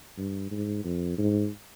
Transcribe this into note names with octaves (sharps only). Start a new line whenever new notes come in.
G2
G#2
F2
G#2